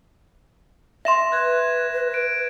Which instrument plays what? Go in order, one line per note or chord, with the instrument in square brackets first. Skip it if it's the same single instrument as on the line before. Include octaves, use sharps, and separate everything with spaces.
[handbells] E5 C6 [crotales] A#6 E7
[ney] B4 [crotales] F#6 G#6
[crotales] D7